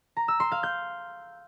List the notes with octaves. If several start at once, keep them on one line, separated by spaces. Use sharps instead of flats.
A#5
E6
C6
F5
G6